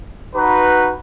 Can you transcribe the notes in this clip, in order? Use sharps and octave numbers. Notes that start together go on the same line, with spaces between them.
D#4 F#4 B4